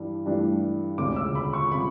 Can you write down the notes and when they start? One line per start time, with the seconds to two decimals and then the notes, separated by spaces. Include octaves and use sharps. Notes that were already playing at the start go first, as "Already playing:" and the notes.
Already playing: G2 E3 D4
0.26 G2 E3 A3 D4
0.98 E1 D2 C#3 D6
1.16 E6
1.35 B5
1.53 C#6
1.72 C#3 B5